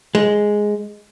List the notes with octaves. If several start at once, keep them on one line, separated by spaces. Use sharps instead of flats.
G#3